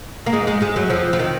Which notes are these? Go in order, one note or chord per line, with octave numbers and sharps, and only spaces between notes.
A#3
G#2 G#3
G#2 G#3
G#2 G#3
F#2 F#3
F2 F3
F3
D#3